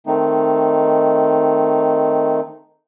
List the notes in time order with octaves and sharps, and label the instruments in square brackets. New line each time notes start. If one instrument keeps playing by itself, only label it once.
[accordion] D#3 A3 C4 D#4